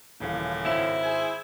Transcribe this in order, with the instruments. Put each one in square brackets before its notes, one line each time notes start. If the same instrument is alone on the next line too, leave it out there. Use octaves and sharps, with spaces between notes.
[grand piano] D#1 E3 F5 [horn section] F#2 A2 C#3
[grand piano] G#1 C4 E7 [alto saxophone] E4
[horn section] G#4 C5 G#5